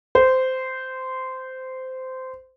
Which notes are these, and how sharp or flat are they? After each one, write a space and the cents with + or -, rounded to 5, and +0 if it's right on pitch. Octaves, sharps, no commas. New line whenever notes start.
C5 -15